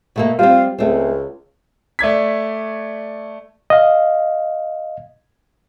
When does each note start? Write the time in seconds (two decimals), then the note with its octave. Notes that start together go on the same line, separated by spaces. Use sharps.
0.16 B2 A3 A#3
0.39 G3 C4 F4
0.78 C#2 A3 C4
1.99 A3 D5 G#6 B6
3.70 D#5 F5